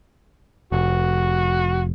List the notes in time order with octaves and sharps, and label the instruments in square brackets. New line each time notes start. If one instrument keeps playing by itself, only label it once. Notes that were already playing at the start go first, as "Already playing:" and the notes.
[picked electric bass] F1 [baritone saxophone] F#4